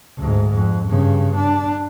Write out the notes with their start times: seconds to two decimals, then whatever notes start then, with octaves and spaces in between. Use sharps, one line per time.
0.17 D2 G#2
0.54 F2
0.86 G2 C#3
1.36 D4